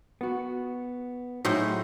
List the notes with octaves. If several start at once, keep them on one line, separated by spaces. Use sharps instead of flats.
B3 F#4
A2 F#3 D#4 F#4 G#4 C5